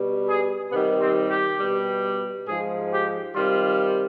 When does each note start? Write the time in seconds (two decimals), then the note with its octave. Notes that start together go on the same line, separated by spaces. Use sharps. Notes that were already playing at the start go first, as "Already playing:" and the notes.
Already playing: B2 G3
0.28 G#4
0.71 C3 D#3 G3 B3
1.01 C4
1.30 G4
1.59 B2 G3
2.47 G#2 F3 G#4
2.92 G4
3.35 C3 D#3 G3 F4